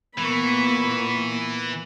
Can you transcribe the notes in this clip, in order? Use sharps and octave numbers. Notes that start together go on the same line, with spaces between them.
A#2 E3 A#3 B3 B5 C#6